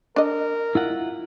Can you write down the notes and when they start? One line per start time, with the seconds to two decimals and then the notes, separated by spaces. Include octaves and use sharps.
0.16 D4 A#4 D#5
0.75 E4 F4 F#5